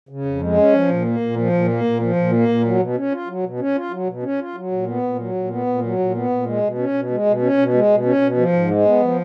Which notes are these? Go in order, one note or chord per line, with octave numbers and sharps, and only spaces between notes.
C#3
F2
G#3
C#4
F3
A#2
A#3
A#2
F3
A#2
A#3
A#2
F3
A#2
A#3
A#2
F#3
B2
C#4
F4
F#3
B2
C#4
F4
F#3
B2
C#4
F4
F#3
A#2
B3
A#2
F#3
A#2
B3
A#2
F#3
A#2
B3
A#2
G#3
B2
C#4
B2
G#3
B2
C#4
B2
G#3
B2
C#4
B2
F3
G#2
G#3
B3
F3